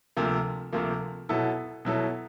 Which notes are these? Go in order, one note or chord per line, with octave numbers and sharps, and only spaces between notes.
D2 C3 F3 A#3
D2 C3 F3 A#3
B2 F#3 B3 E4 A4
B2 F#3 B3 E4 A4